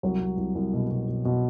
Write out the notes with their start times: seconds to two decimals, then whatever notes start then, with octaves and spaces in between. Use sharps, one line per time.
0.03 C2 F#3
0.20 C2
0.38 C2
0.55 C2
0.73 B2
0.91 B2
1.08 B2
1.25 B2